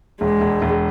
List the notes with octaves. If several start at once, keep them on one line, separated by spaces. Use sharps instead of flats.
E1 G#3
E1
E1